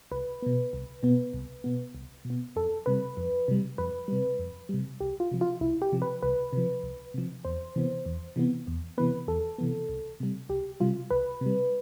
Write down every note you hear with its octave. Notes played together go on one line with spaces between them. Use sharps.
C2 B4
B2 B3
C2
B2 B3
C2
B2 B3
C2
B2
B3
F2 A4
C3 G3 B4
F2
C3 G3
F2 B4
C3 G3
F2
C3 G3
C2 G4
F4
C3 F3
F4
C2 E4
G4
C3 F3
B4
C2 B4
C3 F3
C2
C3 F3
E2 C5
C3 E3 B3
E2
C3 E3 B3
E2
C3 E3 B3 B4
E2 A4
C3 E3 B3
C2
C3 G3
C2 G4
C3 G3 F4
C2 B4
C3 G3